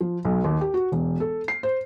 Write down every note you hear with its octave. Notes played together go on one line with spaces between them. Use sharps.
F3
B1
D#2
G4
F#4
E1
A4
C7
C5